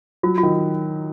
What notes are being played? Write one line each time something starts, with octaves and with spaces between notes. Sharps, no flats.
F#3 F4
F4
D#3